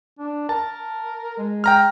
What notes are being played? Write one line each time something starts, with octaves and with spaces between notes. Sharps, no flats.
D4
A#4 A5
G#3
G5 A#5 F6